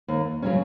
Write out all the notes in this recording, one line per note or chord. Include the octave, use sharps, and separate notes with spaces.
D#2
C#3 F#3 C#4